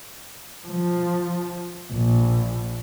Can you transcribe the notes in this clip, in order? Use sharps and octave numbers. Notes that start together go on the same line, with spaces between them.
F3
A#1